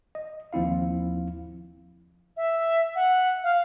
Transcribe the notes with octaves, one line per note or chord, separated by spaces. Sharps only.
D#5
D#2 F3 C4 E4 F5
E5
F#5
F5